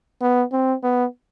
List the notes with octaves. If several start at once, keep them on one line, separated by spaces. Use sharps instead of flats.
B3
C4
B3